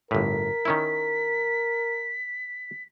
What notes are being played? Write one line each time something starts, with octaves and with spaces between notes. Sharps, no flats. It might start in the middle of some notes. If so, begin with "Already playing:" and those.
G1 A2 A#4 B6
D#3 C#4 E4